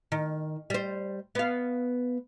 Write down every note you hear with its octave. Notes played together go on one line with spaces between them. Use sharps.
D#3
G3 C5
B3 F5